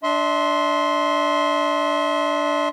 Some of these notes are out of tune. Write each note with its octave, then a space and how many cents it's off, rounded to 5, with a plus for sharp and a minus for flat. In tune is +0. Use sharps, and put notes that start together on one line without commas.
D4 +0 E5 -35 C6 +0